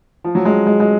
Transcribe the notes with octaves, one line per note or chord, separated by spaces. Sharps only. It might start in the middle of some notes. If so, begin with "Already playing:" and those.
F3
F#3
G#3
G#3
G#3